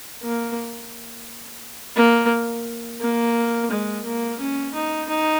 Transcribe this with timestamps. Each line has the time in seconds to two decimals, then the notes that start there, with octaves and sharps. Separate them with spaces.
0.23 A#3
1.96 A#3
3.01 A#3
3.71 G#3
4.06 A#3
4.40 C#4
4.75 D#4
5.09 D#4